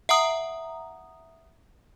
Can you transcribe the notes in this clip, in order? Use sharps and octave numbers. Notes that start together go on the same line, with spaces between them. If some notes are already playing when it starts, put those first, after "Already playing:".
E5 F#5 A#5 D#6